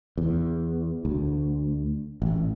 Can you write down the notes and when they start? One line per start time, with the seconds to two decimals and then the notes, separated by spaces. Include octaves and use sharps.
0.18 E2
1.05 D2
2.22 A1